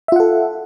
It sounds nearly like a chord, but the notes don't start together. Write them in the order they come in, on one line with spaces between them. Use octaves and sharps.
E5 F4 F#5 A4